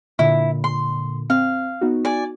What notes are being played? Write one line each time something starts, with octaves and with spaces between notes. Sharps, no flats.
A#2 D3 E4
C6
C4 F5
B3 D#4 F#4
D5 G#5